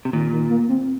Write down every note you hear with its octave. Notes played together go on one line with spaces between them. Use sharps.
C3
A#2 D#3
D#3
A#3
C4